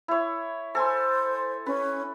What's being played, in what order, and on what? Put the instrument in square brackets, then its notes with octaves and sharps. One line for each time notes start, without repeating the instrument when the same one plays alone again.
[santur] E4 C#5
[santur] A4 G#5 C6 [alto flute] C5
[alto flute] C#4 [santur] B4